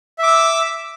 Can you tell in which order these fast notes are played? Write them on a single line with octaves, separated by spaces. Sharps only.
E5 D6 E6